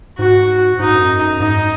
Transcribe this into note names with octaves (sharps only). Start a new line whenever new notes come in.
G#2 F#4
G#2 D#4
F#2
G#2 D#4